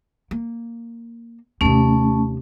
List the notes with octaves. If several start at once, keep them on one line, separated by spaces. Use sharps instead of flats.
A#3
D#2 C3 A3 C#4